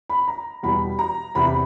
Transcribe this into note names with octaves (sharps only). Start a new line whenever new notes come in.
B5
A#5
E2 B2 G3 B5
A#5
E2 C3 E3 B5
B5